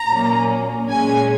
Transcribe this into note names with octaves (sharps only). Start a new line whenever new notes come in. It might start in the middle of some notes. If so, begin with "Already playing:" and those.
Already playing: A#5
A#2 F#3 A#3 C#4
A#2 G#3 C#4 G#5